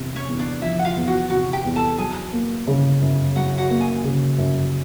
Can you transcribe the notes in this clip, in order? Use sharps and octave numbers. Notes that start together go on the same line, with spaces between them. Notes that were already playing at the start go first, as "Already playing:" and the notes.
Already playing: E2 C3
C#4 C#5
E2
D4 D5
F3 E4 E5
F#5
F4 F5
E2
F#4 F#5
C3 F#4 F#5
G4 G5
E2
A4 A5
F#3 G#4 G#5
A#3
C#3
F#2
F#3 F#4 F#5
F#4 F#5
A#3
G#4 G#5
C#3
F#2